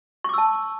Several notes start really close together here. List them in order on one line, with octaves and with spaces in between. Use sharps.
C#6 D6 E6 A5